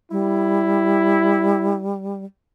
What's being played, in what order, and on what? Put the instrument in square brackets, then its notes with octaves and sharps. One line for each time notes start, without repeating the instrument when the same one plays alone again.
[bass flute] G3 [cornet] E4